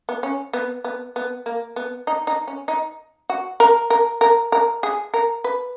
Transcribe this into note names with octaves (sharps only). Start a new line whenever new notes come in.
B3
C#4
B3
B3
B3
A#3
B3
D#4
D#4
C#4
D#4
F#4
A#4
A#4
A#4
A#4
G#4
A#4
B4